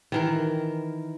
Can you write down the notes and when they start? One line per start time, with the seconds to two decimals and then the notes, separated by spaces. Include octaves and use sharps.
0.12 D#3 E3 A#4